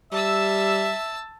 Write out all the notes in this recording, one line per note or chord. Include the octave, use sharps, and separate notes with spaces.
G3 E5 A5 E6